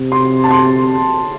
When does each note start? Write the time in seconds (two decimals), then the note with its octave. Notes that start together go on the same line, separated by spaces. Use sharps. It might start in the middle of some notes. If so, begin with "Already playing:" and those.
Already playing: C3
0.12 C6
0.44 A5
0.51 C6